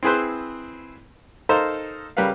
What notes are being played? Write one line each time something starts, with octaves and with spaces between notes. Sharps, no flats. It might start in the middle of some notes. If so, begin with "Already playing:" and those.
C4 E4 G#4 B4 C5
D#4 A4 A#4 C5 F5
C#3 G3 A#4 B4 F5